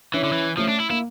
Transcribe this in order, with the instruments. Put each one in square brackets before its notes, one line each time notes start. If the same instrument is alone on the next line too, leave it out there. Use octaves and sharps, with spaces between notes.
[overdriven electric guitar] E3 [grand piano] C#4 E4
[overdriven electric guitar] D3
E3
[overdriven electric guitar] F3 [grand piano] A3 C#4
[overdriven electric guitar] D4
E4
[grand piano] A#3 [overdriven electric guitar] E4